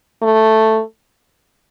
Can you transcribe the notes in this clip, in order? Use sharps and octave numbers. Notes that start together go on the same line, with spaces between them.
A3